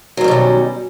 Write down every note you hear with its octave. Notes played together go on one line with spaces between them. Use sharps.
B2 D#3 F#3 G3 C#4